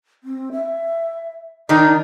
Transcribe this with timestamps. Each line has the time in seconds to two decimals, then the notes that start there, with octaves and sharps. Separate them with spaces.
0.24 C4
0.52 E5
1.69 D#3 D4 D#4 D#5